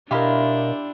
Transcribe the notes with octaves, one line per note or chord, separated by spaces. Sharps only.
B2 D4 E4 F4 G4 A#4 D#5 F5